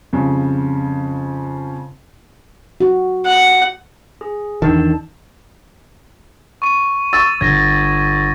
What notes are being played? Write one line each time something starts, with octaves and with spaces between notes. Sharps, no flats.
F2 C#3 G3
F#4
F#5
G#4
E2 D#3 D4 A5
C#6 D#7
C#6 E6 A6
G1 G#6 A#6